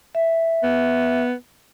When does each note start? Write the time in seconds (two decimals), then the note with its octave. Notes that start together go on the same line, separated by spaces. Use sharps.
0.15 E5
0.63 B3